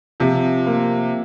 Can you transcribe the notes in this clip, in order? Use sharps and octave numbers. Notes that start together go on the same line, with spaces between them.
C3 F3
A#3